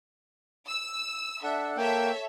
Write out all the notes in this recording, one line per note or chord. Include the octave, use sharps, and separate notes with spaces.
E6
D4 A4 E5 F#5
A#3 A4 C#5 E5 G5